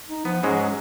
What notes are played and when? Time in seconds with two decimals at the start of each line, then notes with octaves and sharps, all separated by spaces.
0.10 D#4
0.25 F3 B3
0.43 G#2 F#3 G#3 C#4